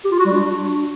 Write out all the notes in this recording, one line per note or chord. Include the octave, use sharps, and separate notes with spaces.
G4
F4
F#4
G3
D4